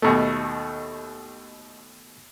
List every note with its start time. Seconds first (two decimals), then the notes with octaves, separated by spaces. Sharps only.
0.02 D#2 B2 A3